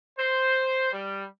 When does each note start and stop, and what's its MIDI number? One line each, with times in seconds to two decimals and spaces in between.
0.19 0.91 72
0.92 1.25 55